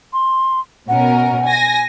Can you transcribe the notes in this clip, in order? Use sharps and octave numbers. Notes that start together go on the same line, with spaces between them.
C6
B2 C#4 A#4 F#5
G#5 A#6